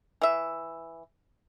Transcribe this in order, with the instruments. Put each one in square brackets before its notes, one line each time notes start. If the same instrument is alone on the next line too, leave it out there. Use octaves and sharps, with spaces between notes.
[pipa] E3 E5